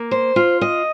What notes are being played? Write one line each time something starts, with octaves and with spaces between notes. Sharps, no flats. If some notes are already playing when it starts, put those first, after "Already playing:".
Already playing: A#3
C5
F4
D#5